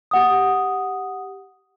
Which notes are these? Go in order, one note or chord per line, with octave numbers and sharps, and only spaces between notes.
G4 F#5 D#6